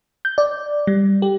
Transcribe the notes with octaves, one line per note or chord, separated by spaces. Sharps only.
G6
D5
G3
G4